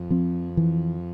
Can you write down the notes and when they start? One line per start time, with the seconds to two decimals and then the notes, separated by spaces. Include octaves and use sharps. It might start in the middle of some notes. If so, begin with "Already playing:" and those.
Already playing: F2
0.10 F3 C4
0.57 E3